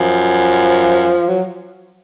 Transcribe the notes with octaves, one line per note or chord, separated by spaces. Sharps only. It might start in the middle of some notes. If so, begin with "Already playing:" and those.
Already playing: F#2 F3
F#3